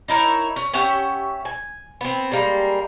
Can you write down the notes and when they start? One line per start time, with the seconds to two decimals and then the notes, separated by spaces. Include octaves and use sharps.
0.08 D#4 E4 A#4 C#5
0.56 C#4
0.73 C#4 G4 E5 F#5
1.45 G#5
2.01 B3 C4
2.32 G3 G#3 A#3